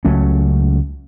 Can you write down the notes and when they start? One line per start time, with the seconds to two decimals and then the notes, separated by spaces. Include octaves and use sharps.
0.05 C#2 F#3 A3 C#4